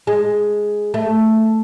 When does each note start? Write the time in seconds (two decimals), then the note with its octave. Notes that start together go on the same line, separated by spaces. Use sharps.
0.07 G#3
0.94 A3